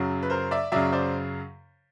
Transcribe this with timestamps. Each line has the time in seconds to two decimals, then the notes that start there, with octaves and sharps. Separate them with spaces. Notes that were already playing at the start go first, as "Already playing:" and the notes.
Already playing: F#2 C#3 F#3
0.23 B4
0.30 A#4 C5
0.51 D5 E5
0.72 F#2 C#3 F#3 D5 E5
0.92 C5 D5